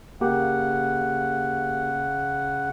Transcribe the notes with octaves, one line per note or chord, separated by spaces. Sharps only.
C#3 A#3 G4 F#5